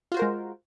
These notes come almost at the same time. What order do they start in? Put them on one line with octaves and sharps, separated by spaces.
F4 F#4 C5 A#4 G#3